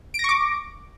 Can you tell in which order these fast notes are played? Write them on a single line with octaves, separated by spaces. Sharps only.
D7 A#6 C#6 D6